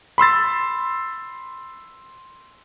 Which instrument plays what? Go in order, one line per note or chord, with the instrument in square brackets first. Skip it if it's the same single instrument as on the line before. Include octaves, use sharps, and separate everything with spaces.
[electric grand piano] B5 C6 E6 A6